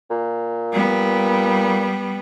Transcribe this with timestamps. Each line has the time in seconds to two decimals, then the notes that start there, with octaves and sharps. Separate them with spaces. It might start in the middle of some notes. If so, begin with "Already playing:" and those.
0.11 A#2
0.73 G3 B3